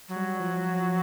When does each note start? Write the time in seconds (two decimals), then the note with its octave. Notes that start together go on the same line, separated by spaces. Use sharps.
0.09 F#3
0.16 G3
0.40 F3